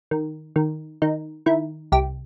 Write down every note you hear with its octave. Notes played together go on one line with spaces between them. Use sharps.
D#3
D#3
D#3 D#4
D#3 E4
C2 G4